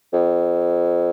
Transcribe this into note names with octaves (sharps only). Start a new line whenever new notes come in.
F2